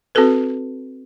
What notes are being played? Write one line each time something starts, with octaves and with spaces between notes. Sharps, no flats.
C4 F#4 G#4 A4 B4